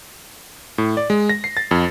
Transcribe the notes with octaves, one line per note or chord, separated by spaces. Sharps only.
A2
D5
G#3
A#6
C7
A6
F2